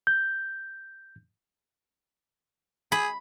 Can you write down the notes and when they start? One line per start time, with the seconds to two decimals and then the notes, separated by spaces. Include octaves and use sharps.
0.07 G6
2.92 G#4 B5